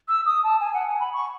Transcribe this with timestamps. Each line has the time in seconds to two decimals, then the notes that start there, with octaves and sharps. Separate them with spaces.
0.09 E6
0.26 D#6
0.44 A5
0.60 G#5
0.74 F#5
0.87 G#5
1.00 B5
1.14 C#6